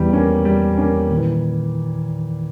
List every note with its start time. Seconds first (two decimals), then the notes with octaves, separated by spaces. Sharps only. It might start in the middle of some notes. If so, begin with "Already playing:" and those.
Already playing: E2 E3 G3
0.13 A#3 C#4
0.45 G3
0.78 A#3 C#4
1.10 A#2 D#3
1.18 E3